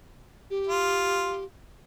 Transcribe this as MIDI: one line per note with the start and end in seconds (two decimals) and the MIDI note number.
0.50 1.45 67
0.67 1.43 65